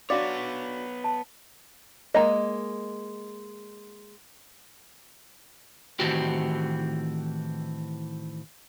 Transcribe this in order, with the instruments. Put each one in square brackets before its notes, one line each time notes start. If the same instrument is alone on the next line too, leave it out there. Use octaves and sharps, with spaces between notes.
[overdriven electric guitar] B3 C#5 [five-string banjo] D4 F#4 D5 [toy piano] F5 C6 D6
[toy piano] A5
[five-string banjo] G#3 A#3 D#5
[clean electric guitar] A2 D#3 E3 C4 F#4 G4